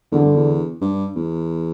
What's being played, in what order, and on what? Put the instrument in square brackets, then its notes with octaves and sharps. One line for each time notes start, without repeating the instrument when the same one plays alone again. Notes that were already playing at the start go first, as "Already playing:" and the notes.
[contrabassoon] E2 [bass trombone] D3
[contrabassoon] G2
E2
G2
E2